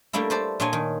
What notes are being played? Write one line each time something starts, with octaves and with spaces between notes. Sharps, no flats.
G3 A3 A#3 D4 E4
B4 C5 D5 A5
A#2 D4 F4 C#5 G#5
D#3